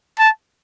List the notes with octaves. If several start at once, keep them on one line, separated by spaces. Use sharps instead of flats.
A5